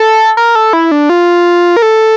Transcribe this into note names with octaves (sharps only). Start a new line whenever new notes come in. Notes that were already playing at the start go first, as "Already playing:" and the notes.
Already playing: A4
A#4
A4
E4
D4
F4
A#4
A4